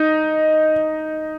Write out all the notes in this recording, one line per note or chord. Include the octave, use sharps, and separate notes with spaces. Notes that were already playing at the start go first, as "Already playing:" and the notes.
Already playing: D#4